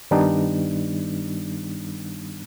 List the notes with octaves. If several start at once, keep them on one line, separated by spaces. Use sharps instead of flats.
G2 D#3 G3 B3 D4 D#4